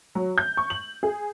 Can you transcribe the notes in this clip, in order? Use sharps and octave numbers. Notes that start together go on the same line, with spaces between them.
F#3
G6
C#6
F#7
G#4